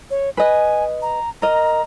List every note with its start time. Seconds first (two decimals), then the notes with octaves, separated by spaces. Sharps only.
0.11 C#5
0.37 B4 D#5 G#5
1.02 A#5
1.42 A#4 D#5 A#5